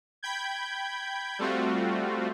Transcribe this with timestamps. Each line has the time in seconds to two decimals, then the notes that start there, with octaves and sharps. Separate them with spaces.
0.23 G5 B5 G6 G#6
1.39 G3 A3 C4 F4 F#4